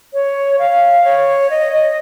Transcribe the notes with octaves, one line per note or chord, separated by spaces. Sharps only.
C#5
F5
C#5
D#5
D#5